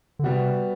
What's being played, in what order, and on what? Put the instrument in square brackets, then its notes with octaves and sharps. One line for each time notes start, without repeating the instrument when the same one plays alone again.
[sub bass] D3
[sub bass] C3 [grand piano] G3 B3 F#4